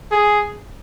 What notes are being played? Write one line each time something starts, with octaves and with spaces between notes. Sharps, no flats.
G#4